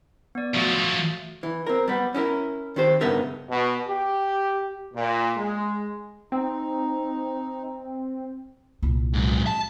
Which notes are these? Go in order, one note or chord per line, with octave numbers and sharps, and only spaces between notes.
B3 D5
F3 F#3 A3 F#4 A6
E3
C4 A#4
G3 B3
C#4 E4 G4 A#4
D#3 C4 G4 C5
G2 C#3 B3 D#4 A#4 E5
B2
G4
A#2
G#3
C4 D#4
C2 A#2
G#2 F#3
A5